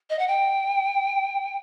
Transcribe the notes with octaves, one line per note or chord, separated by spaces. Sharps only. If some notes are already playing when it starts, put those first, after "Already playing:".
D#5
F#5
G5